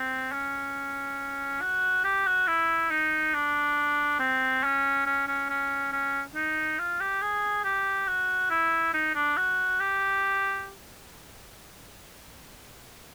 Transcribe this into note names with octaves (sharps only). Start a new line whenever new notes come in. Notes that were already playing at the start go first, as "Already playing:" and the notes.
Already playing: C4
C#4
F#4
G4
F#4
E4
D#4
D4
C4
C#4
C#4
C#4
C#4
C#4
D#4
F4
G4
G#4
G4
F#4
E4
D#4
D4
F#4
G4